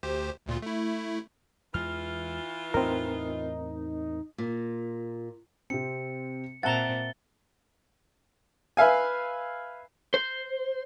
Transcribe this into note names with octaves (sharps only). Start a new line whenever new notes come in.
D2 G4 C5
D2 A#2 F4
A3 E4
E2 E3 G#3 F4 F6
E2 A2 C4 D#4 A#4
A#2
C3 C4 C#7
A#2 C4 E5 F#5 A5 A#5 A6 G7
B4 E5 F5 G#5
C5